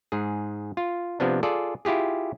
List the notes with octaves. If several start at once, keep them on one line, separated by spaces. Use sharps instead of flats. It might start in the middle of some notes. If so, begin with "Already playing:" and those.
G#2 G#4
F4
C3 F3 B3 D4
F4 G#4 A4 D5
E4 F4 G4 G#4